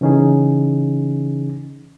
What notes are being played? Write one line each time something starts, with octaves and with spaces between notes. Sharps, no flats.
C#3 E3 C#4 D#4 G#4